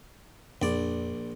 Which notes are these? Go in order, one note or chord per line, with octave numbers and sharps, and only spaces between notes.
A#1 F2 D4 D5